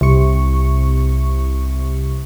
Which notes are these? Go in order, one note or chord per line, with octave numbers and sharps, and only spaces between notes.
C2 C#6